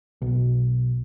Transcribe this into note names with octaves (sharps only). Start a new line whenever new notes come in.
B1